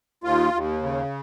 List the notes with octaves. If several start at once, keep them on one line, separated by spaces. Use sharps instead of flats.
D#2 F4
D#2
C#3